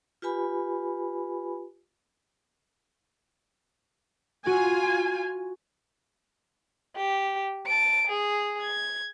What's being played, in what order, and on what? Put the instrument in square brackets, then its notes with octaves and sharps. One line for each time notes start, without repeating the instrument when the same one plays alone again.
[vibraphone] F4 G4 B4 G#5 B5
[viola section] F4 G#5 [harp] F#4
[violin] G4
A5 D7
G#4
G#6